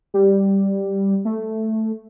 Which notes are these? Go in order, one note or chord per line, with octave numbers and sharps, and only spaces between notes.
G3
A3